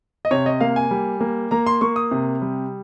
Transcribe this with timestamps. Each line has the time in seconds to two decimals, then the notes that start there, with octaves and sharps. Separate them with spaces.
0.25 D#5
0.31 C3 C#5
0.46 D#5
0.61 A#3 F5
0.76 G#5
0.91 G3
1.20 A#3
1.51 A#3 A#5
1.66 C6
1.81 A#3 C#6
1.96 D#6
2.11 C3
2.42 G3